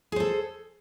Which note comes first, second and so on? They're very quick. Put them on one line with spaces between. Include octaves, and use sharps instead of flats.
G#4 C5 A4